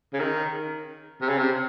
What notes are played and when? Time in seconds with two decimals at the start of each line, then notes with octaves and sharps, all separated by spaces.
0.13 C#3
0.20 D#3
1.21 C3
1.29 C#3
1.38 C3